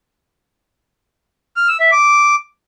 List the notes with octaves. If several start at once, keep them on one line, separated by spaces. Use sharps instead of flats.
F6
E6
E5
D6